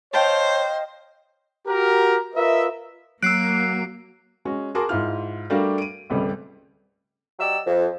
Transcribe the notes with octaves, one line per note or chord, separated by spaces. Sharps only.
C5 C#5 D#5 F5 G5 A5
F#4 G4 A#4
F4 A#4 B4 D#5 E5
F#3 A#3 E6 F#6 C7 D7
G#3 C#4 F#4
F#4 G#4 A#4 A5 C6 D6
G#2 E4 F4 F6
G3 A3 D4 F#4 A#4 F5
D7 D#7
G#1 C#2 G3 A3
F#3 G4 D5 D#5 E6
F2